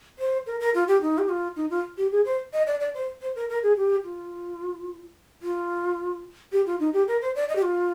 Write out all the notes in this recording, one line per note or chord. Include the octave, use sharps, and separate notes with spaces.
C5
A#4
A#4
F4
G4
D#4
G4
F4
D#4
F4
G4
G#4
C5
D#5
D5
D5
C5
C5
A#4
A#4
G#4
G4
F4
F4
G4
F4
D#4
G4
A#4
C5
D5
D#5
G4
F4